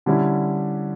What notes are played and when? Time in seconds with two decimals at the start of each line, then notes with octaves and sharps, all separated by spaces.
0.06 D3 G3 C#4 E4